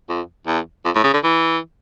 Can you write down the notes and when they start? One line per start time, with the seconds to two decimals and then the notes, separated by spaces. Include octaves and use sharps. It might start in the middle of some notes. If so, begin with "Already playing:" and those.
0.09 F2
0.47 E2
0.85 F2
0.95 A2
1.04 C#3
1.13 D3
1.24 E3